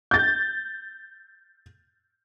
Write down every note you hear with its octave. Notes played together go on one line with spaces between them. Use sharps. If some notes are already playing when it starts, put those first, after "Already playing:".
G6 A6